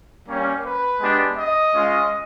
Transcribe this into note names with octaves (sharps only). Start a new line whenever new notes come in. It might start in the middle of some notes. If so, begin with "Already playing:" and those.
G3 A#3 C#4
B4
G#3 B3 D4 G4
D#5
G#3 C#4 F4